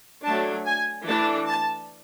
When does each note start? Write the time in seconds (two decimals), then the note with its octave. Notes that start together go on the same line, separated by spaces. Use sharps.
0.24 F#3 A3 D4 A5
0.66 G#5
1.07 E3 A3 D4 A5
1.49 A5